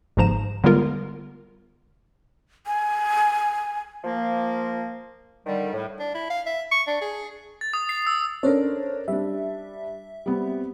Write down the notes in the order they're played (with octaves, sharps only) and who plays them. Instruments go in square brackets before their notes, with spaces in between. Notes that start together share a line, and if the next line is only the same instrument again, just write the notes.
[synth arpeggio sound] G1 G#2 F3 A#5 E7
D3 G3 G#3 B3 F4 A#4
[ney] G#5
[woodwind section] F3 A#3
D3 D#3 G3
A2
[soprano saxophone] D4
E4
F5
E5
C#6
D4
G#4
[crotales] A6
D#6
C7
E6
[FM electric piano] C#4 C5 C#5 [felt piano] D4 A4 A#4
[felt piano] G3 D4 [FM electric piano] E5
[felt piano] G3 B3 C4